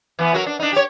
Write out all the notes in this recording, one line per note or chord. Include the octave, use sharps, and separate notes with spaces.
E3 B3
F#3 F#4 A#4
D4
D4 D#4
G4 C#5